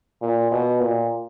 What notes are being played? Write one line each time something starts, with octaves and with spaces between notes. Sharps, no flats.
A#2
B2
A#2